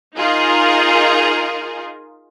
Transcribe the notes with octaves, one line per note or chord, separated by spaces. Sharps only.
D#4 F4 G#4 A#4